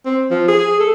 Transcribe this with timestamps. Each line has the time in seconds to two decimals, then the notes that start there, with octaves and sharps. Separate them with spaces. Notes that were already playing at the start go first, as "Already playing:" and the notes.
0.06 C4
0.31 F3
0.48 G#4
0.80 A4